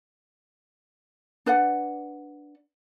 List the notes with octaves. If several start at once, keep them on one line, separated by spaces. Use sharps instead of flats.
D4 B4 D5 F#5